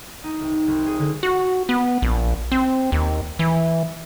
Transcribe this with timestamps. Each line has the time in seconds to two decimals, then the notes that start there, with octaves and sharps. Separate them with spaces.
0.24 D#4
0.40 C2
0.67 C2
0.86 G#4
0.99 D3
1.23 F#4
1.69 B3
2.02 A#1
2.52 C4
2.92 D#2
3.39 E3